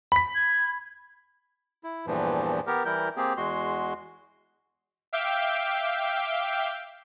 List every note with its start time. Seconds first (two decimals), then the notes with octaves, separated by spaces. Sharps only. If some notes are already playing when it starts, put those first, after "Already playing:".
0.12 B5 B6
0.35 G#6
1.84 E4
2.07 E2 G2 A#2 E3 F3
2.67 B3 G4 A#4
2.85 E3 G3 E4 A#4 G6
3.17 A#3 C4 G4 G#4
3.37 E2 G#3 F#4 C6
5.13 E5 F5 G5 D6 G6 D7